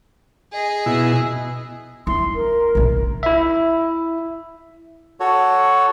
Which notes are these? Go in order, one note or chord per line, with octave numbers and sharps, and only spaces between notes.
G#4 D#5
B2 E4
E4 C6
A#4
A#1 E3
E4 E5
F#4 A4 C#5